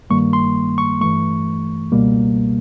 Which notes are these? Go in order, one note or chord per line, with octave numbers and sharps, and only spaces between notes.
G2 D#3 G3 A#3 C#6
C6
C#6
G2 E3 A3 C#6
C#2 B2 G3 A#3